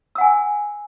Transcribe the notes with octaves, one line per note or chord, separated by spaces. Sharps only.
F#5 G#5 E6